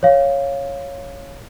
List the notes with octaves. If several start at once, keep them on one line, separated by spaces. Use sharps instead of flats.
C#5 F5